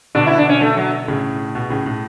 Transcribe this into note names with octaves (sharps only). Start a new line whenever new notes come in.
B2 D3 D4
E4
D4
C#4
A3
F#3
A2 C#3
B2
A2 C#3
A2